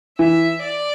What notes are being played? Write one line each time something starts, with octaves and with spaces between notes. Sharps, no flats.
E3 E5
D5